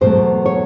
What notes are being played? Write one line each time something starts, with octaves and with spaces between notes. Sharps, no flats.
E2 B2 F#3 A3 C5
C#5